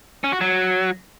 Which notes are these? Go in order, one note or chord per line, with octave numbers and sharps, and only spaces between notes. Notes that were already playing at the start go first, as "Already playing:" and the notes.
C#4
F#4
F#3